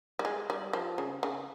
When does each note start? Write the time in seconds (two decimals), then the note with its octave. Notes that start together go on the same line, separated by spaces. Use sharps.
0.19 G3
0.25 G#3
0.50 G3
0.73 F3
0.98 C#3
1.23 C#3